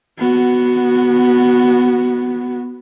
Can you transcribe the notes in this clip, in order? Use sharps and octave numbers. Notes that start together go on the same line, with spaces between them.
B3 F#4